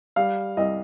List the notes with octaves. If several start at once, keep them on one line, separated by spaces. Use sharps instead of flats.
G3 F5
C2 D#5